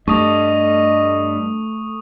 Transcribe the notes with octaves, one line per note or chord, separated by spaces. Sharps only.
G2 A3 D#5 C#6 D#6